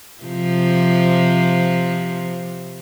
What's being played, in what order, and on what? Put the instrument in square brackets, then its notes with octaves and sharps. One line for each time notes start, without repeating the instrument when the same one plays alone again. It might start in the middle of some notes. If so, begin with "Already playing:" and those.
[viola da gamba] C3 F3